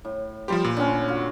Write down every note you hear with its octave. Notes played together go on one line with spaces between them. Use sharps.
A2
F3 G3 G4 C5 B5 C6
A#2
D3 C4 C#4
F4 F#4